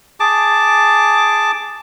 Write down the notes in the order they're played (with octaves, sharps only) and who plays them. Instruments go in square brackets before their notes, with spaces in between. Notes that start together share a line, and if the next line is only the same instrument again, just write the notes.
[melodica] G#4 A5 D6